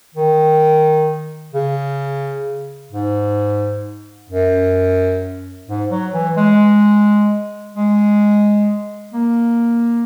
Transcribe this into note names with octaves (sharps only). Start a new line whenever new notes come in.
D#3
C#3
G#2
F#2
G#2
F#3
E3
G#3
G#3
A#3